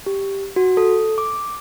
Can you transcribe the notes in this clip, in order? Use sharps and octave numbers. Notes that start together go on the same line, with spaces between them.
G4
F#4
A4
D6